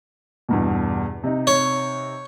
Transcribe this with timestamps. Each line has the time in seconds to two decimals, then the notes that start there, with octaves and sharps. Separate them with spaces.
0.49 E2 G2 B2
1.23 C3 D#4
1.47 C#5